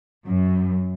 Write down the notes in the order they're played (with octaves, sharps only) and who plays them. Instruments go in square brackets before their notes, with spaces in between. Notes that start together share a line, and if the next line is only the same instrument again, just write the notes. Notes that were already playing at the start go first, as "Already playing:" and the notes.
[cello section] F#2